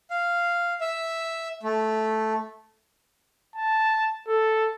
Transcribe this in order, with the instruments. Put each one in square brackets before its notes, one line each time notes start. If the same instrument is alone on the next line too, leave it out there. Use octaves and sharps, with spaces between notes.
[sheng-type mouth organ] F5
E5
A3
[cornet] A5
A4